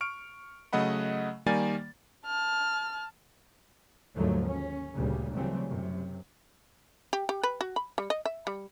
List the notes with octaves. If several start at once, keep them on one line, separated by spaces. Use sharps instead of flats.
C#6 F6 D7
C#3 F#3 A3 D#5 F#5 B5
D#3 G3 A#3 D5 G#5 A6
A5 F6
D#2 G#2 D3 F3 F#3 A3
C#4
D2 A#2 C#3 G3
C#3 E3 F#3 G3 A3 C4
F#2 C3
G4
G4
B4
F#4
B5
G3
D#5
E5
G3